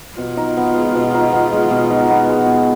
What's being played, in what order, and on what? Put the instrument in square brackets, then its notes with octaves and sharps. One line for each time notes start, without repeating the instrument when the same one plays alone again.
[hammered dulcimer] B2 [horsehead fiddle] F4
[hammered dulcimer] D#4
B3
G#3
B2
D#4
B3
G#3
B2
D#4
B3
G#3
B2